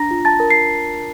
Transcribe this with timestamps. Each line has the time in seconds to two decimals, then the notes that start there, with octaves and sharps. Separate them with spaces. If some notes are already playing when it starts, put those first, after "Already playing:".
Already playing: D4 A#5 A#6
0.11 F4
0.25 A5 A6
0.40 A#4
0.50 C7